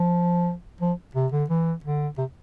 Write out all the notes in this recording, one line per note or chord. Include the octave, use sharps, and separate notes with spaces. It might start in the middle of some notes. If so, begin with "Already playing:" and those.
Already playing: F3
F3
C3
D3
E3
D3
C3